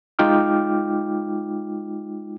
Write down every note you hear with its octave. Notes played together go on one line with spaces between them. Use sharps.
G#3 D#4 F4 G5 D6 F6